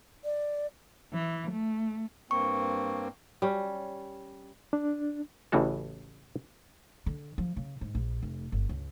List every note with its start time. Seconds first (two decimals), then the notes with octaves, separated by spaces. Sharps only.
0.24 D5
1.14 E3
1.51 A3
2.31 G2 A#3 C4 C#6
3.42 G3 C#4
4.73 D4
5.52 A1 A2 C#3 E3 F#4 A4
7.06 D3
7.38 F3
7.57 C#3
7.81 G#2
7.95 A#1
8.23 F1
8.52 G1
8.69 C#2